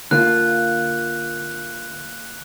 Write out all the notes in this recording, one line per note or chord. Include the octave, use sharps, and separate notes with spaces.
D3 A#3 F4 F#6